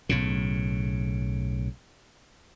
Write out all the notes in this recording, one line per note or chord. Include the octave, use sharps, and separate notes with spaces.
B1 A2 C#3